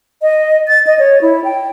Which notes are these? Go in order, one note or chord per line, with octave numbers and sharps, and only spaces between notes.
D#5
A6
D#5
C#5
E4
G5